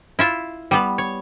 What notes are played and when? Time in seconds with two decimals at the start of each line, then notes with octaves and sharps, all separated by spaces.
0.19 E4 F4 E5
0.71 G3 B3
0.98 C#5